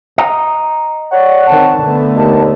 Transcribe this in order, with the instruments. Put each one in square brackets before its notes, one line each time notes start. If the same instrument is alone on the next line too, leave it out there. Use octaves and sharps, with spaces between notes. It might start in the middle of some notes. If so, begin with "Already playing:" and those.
[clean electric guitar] D#5 A#5
[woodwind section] C#5 F#5 [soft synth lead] D5
[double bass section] D#3 C4 [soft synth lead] A5
[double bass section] D3 A3 B3
[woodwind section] D#2 [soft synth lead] A5